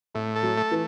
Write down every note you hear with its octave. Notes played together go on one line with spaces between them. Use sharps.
A2 A3
A4
F#3
A3
E3